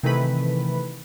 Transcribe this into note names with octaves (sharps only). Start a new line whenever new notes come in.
C3 D#3 E3 A3 B4 B5